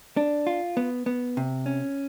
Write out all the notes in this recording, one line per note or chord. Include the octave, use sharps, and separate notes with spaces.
D4
F4
B3
B3
C3
C#4